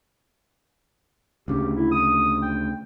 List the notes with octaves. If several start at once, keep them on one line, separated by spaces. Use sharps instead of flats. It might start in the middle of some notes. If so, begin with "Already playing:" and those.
D2 C#3 G4
E4
D#6
G5